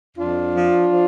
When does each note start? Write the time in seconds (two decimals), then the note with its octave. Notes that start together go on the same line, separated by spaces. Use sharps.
0.17 F2 D4 F4
0.54 F3
0.89 F3